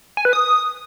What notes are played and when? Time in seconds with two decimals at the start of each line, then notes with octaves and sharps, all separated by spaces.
0.17 G#5
0.25 B4
0.33 D#6